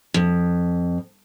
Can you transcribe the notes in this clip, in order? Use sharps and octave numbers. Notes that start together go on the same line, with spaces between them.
F2